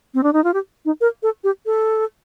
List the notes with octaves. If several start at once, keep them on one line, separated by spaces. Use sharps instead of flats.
C4
D4
D#4
F4
G4
D#4
A#4
A4
G4
A4